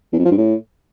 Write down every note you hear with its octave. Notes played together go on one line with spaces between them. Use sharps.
E2
F2
F3
G2
A2